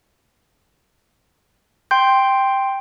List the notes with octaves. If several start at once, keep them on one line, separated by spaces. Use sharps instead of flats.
G5 C6 G6